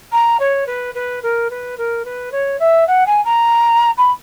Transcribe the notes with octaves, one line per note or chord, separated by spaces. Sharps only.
A#5
C#5
B4
B4
A#4
B4
A#4
B4
C#5
E5
F#5
G#5
A#5
B5